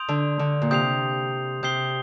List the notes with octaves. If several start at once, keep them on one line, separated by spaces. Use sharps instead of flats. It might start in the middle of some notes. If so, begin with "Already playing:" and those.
Already playing: C6 D#6 G6 D7 F7
D3
D3
A#2
C3 D#6 G6 C7 F7
C3 D#6 G6 C7 G7